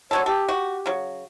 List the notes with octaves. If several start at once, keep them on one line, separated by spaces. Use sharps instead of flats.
D3 F#3 A4 C#5
G4 A4
F#4
C#3 F#3